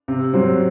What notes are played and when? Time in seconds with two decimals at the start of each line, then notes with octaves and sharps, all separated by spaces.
0.08 C3
0.33 F#3 C4